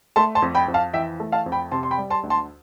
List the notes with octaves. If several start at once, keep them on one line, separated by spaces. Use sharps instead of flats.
A3 A5 C6
A5 C6
F2
G5 B5
F2
F5 A5
E3 E5 G5
A3
F5 A5
F2
G5 B5
C3 A5 C6
C6
G5 B5
G3
A5 C6
D2
A5 C6